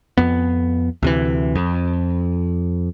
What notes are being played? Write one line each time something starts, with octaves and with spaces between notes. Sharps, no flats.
F2 B3
D2 C3 E3
F2